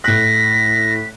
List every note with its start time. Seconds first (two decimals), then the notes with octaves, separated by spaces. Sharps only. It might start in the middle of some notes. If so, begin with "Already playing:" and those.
0.04 A2 F#6 A#6 B6